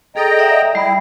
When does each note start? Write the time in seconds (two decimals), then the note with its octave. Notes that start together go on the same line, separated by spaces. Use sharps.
0.16 G#4 A4 D5 D#5 G5 A#5
0.39 D5 E5 F#5
0.75 G3 E4